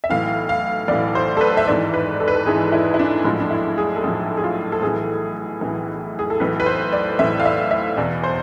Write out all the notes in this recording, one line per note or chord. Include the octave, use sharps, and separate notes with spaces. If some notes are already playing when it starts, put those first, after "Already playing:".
E5
B1 A2 E3 F5
F5
B1 A2 E3 D5
C5
A4
B4
E5
G#1 G#2 E3 D5
B4
A4
B4
A4
G#1 G#2 E3 G#4
E4
E4
D4
B1 A2 F3 G#3
D4
E4
G#4
A4
B1 A2 F3 G#4
G#4
F4
A4
B1 A2 E3 G#4
B1 A2 E3
G#4
A4
B1 A2 E3 B4
B4
C5
D5
B1 A2 E3 E5
F5
E5
E5
E2 B2 D5
C5